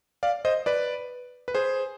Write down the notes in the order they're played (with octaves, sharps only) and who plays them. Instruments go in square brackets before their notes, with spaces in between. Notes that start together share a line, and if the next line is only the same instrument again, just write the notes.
[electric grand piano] D5 F5
C5 D#5
B4 D5
B4
G#4 C5